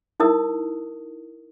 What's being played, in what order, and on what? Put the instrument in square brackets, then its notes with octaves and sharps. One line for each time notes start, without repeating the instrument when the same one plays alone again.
[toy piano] D#4 E4 A#4 D#6